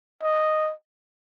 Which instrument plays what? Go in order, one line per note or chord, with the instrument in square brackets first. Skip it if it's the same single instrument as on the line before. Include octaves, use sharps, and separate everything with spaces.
[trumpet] D#5